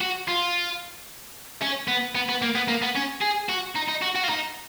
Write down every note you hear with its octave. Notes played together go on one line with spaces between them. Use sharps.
F#4
F4
C#4
B3
B3
B3
A#3
B3
A#3
B3
C#4
G#4
F#4
D#4
D#4
F#4
F#4
F4
D#4